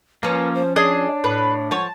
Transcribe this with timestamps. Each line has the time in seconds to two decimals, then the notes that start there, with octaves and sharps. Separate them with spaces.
0.23 F3 A#3 C#4 B4
0.54 C5
0.76 D4 G#4 C#5 D#5
1.24 A2 B4
1.71 F3 C#5 F#5 A5